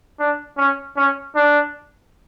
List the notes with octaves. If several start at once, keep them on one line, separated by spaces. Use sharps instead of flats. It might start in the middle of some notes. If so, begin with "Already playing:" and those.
D4
C#4
C#4
D4